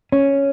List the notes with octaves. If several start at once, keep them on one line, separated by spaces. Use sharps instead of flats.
C#4